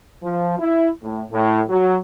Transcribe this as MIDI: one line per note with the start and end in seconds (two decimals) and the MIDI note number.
0.22 0.54 53
0.58 0.88 64
1.02 1.22 45
1.31 1.61 45
1.68 1.96 54